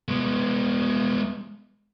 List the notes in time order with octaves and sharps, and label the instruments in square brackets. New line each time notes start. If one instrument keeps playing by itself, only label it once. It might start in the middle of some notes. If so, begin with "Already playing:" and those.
[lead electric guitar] G#3 B3